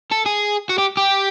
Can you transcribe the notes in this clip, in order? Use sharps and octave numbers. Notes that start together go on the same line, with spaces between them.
A4
G#4
F#4
G4
G4